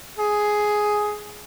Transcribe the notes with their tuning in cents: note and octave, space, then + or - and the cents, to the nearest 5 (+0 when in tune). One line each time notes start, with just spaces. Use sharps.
G#4 +5